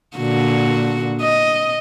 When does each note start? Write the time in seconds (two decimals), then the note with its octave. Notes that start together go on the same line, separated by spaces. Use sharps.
0.17 A#2 D3 F#4
1.22 D#5